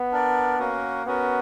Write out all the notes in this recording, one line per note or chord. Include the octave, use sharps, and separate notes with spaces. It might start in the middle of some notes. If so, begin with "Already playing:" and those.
Already playing: B3
D4 A#4 D5
A#3 C#4 F#4 A#4
B3 C#4 F#4 A#4